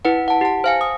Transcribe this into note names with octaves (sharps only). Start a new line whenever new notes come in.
E4 B4 F#5
F#5 A5
G4 A5
C5 F5 G#5
D#6